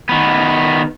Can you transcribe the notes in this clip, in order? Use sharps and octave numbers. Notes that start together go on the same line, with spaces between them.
D#3 B3